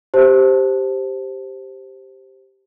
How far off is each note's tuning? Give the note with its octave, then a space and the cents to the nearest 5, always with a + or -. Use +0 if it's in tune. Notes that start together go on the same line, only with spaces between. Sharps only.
G4 +0 C5 +0 A5 +0